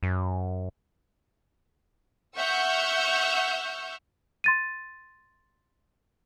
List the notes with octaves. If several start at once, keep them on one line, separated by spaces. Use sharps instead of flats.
F#2
E5 F#5 C#6 E6 F6 G6
C6 A6 D#7